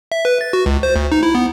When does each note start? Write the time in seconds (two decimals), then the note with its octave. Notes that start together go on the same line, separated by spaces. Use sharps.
0.12 E5
0.25 B4
0.41 A6
0.53 F#4
0.66 C#2
0.83 C5
0.96 D2
1.12 D#4
1.23 E4
1.35 B3